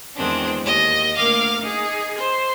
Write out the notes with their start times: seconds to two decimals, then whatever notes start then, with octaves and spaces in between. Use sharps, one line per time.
0.16 E2 D#3 G#3 C4 D4
0.63 D#2 D#5
1.16 D2 A#3 A#4 F5 D6
1.60 D#4 G#4
2.16 C5